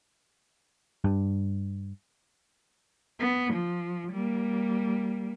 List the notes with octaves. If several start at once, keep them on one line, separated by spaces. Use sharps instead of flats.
G2
B3
F3
G3 A#3